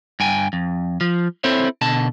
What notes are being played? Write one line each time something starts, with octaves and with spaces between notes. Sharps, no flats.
G2 G5 G#5
F2
F3
C4 E4 A4 C5 C#5
B2 D3 A5